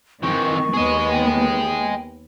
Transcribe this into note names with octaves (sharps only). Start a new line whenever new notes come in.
D#3 E3 C4 C#6
D#2 B3 G#4 D#5
G5